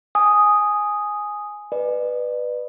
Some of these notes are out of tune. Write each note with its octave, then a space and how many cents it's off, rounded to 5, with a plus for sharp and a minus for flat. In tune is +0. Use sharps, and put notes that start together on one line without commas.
G#5 +0 D#6 +0
B4 +0 D5 +35